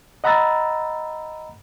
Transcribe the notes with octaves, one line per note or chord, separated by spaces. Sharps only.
D#5 F#5 A#5 B5 E6 A6